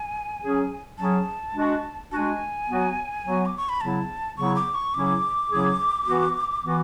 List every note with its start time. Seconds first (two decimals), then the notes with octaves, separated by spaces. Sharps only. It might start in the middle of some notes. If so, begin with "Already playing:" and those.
Already playing: G#5
0.42 F#3 C#4 G#4
0.98 F#3 C#4 G#4 A5
1.54 G#3 D4 F#4
2.11 G#3 D4 F#4 G#5 A5
2.68 F#3 B3 F#4
3.24 F#3 B3 F#4
3.46 D6
3.57 C#6
3.69 B5
3.81 C#3 F#3 B3 E4 A5
4.37 C#3 F#3 B3 E4 C#6
4.56 D6
4.74 C#6
4.94 C#3 F#3 C#4 E4 G#4 D6
5.50 C#3 F#3 C#4 E4 G#4
6.06 E3 B3 F#4
6.64 E3 B3 F#4